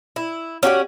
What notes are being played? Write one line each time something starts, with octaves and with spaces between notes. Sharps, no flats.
E4
C#4 F#4 G4 F#5